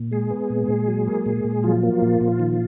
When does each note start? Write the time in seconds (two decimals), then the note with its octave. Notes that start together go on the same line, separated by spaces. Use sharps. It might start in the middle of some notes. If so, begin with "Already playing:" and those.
Already playing: A#2
0.11 G#3 G#4
0.30 B3
0.50 A#2
0.68 A#2
0.88 F#3
1.08 A#3
1.26 A#2
1.44 A#2
1.64 F3 F#3 F4
1.83 A#3
2.02 A#2
2.21 A#2
2.39 D#3